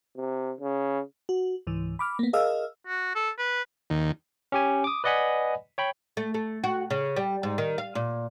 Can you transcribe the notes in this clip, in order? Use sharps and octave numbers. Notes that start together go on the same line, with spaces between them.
C3
C#3
F#4
C#2 G#2 E3
B5 D6 F6
A#3 B3
G#4 A#4 D#5 F5 E6 F6
F#4
A4
B4
D#2
C#4 G4 G#5
D6 D#6
B4 D5 D#5 F#5 G#5 B5
C#5 G5 B5
A3
A3
F#4
C#3
G3
G#2
D#3
F5
A#2